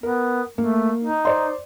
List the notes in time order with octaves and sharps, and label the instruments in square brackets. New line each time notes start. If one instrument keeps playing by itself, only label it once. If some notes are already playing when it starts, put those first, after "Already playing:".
[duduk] B3 [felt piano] A#4
[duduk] A3 [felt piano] A#3
[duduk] D#4
[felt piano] C5 D5 C6